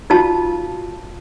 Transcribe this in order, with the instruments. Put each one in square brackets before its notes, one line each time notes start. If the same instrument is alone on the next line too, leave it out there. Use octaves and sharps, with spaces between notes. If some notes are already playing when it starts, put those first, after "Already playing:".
[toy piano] D#4 F4 F#4 F5 A5